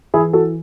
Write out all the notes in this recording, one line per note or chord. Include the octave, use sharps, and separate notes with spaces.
E3 E4 G#4
F#4 A4